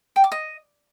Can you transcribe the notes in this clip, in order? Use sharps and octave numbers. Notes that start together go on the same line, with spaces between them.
G5
D6
D#5